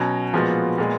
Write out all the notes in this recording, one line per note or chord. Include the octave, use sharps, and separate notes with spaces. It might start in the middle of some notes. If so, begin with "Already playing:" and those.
Already playing: B2 F#3 C#4 F#4
A#2 F3 G#3 B3 F#4
A#2 G#3 B3